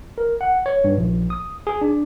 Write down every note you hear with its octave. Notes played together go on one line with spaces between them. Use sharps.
A#4
F#5
C#5
G2
A#1
D#6
G#4
D4